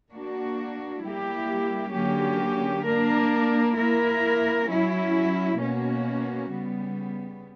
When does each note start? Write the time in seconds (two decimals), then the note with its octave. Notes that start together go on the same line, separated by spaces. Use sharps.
0.11 A#3 D4 F#4
1.02 G3 A#3 E4 G4
1.93 D3 F#3 A#3 C#4 G4
2.85 A#3 D4 A#4
3.76 A#3 E4 A#4
4.68 F#3 C#4 E4
5.58 B2 A#3 C#4 F#4
6.50 C#3 G3 B3